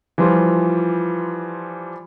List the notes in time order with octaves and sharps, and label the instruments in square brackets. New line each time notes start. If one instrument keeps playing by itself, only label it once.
[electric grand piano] E3 F3 G3 F4